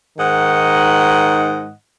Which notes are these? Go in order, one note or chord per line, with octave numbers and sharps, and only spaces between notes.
G#2 D#3 D#5 F#5